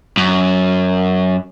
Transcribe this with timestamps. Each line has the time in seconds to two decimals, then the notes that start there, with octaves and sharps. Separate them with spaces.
0.17 F#2